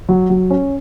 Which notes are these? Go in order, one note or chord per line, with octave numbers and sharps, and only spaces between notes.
F#3
F#3
C#4